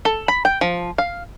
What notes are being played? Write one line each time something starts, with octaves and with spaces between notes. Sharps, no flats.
A4
B5
G5
F3
F5